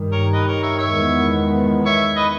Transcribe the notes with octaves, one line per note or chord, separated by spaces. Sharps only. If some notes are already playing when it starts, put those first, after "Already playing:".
Already playing: G2 D#3 G3
A#4 C#5
B4 D#5
A#4 C#5
C#5 E5
C#5 E5
E2 D#3 G#3 B3
C#5 E5
B4 D#5